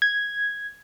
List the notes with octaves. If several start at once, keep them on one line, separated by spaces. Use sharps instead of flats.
G#6